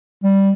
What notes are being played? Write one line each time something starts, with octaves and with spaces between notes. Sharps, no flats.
G3